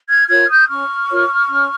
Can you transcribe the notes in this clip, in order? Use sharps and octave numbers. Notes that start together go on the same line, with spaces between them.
F6 G#6
F4 A#4 C#5 F6 G#6
D#6 G6
C#4 C#6 F6
F4 A#4 C#5
C#4